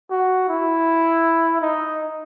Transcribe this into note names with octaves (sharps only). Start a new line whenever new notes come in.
F#4
E4
D#4